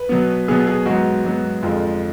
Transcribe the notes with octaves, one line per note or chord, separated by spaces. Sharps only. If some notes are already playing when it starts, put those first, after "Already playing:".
Already playing: B4
B2 F#3 B3
B2 F#3 B3 G#4
G#4
G#2 F#3 B3 F#4
G#2 F#3 B3
F2 D3 G#3 F4